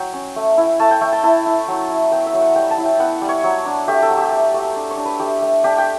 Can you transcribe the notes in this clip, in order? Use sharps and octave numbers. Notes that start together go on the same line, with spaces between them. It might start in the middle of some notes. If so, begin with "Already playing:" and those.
Already playing: F#3 G5
C#4
A3
E4
A3 A5
G5
A3 G5
A5
E4 A5
E4
F#3
E4
B3 G5
E5
F#3
F#5
G3 G5
A5
E4
G5
B3 F#5
G3
C#5
F#3
D4
A3 G4
A4
F#3
G4
A3
A3
D4
C#5
D4
B4
A3 G4
A3
D4 G4
G5